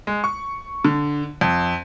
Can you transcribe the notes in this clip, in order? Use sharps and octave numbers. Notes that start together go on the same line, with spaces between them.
G#3
C#6
D3
F2